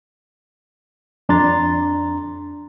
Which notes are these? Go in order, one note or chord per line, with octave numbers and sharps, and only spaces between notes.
F2 D4 A#5 C6 A6